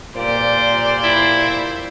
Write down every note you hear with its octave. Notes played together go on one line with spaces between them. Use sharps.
A#2 G4 C5 D5
E4